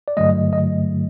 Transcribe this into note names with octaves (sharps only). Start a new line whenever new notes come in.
D5
G2 D3 F#3 A3 D#5
D#5